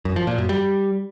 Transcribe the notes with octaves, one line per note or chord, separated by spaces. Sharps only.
F#2
F3
A#2
F#2
G3